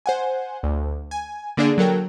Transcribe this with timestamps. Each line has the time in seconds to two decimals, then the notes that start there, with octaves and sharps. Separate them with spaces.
0.06 C5 F#5 G#5
0.63 D2
1.11 G#5
1.57 D3 A#3 D4 G#4 D5
1.78 F#3 A4 A#4 G5